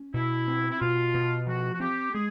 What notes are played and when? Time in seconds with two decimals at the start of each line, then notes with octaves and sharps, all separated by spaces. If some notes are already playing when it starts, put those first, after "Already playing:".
Already playing: C#4
0.14 B2 E4
0.48 C4
0.71 E4
0.80 B2 F4
1.14 B2
1.47 F3 F#4
1.75 F#4
1.80 C4 G4
2.14 G#3 G#4